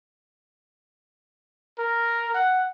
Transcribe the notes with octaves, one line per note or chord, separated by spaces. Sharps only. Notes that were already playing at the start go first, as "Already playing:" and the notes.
A#4
F#5